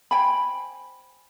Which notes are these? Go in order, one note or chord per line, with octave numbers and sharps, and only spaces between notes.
C5 G5 G#5 B5